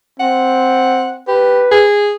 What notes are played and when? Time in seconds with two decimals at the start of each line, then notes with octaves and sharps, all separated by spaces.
0.20 C4 F#5
1.28 G4 B4
1.72 G#4